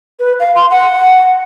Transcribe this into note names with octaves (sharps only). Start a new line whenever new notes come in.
B4
F5
C6
F#5